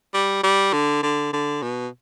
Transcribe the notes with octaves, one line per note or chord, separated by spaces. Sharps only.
G3
G3
D3
D3
D3
B2